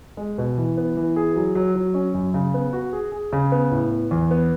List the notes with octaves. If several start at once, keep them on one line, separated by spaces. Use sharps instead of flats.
G#3
B2
E3
B3
E3
G#4
F#3
F#3
F#3
C#4
F#2
C#3
B3
F#4
G#4
G#4
C#3
B3
A2
B3
E2
B3